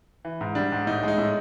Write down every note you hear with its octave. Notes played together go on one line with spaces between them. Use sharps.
E3
G#2
G3 D4
G#2
A2 D#4
G#3 D#4
A2